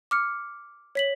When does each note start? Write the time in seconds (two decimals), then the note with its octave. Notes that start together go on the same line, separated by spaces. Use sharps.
0.11 D6 F6 C#7
0.95 C#5 B6 F#7